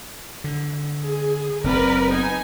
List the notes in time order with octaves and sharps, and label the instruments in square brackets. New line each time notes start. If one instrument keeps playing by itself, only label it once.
[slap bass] D3
[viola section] G#4
[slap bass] F#1 C4 [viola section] A#4 B4 D5
[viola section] B3 D#4 G#5